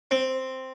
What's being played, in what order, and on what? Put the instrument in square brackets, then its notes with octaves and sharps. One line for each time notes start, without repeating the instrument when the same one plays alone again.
[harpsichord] C4